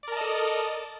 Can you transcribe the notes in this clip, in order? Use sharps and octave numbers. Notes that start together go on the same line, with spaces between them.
A4 A#4 D5 D#5 A5